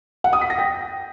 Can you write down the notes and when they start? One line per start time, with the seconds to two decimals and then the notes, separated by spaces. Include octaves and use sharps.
0.24 F#5
0.33 D#6
0.41 B6
0.50 A#6
0.59 G5